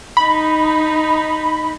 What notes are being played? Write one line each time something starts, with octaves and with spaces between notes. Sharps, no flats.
D#4 B5